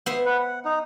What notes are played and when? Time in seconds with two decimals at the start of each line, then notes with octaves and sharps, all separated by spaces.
0.06 B3 C5 E5
0.26 B4 F#5
0.39 F#5
0.65 D#4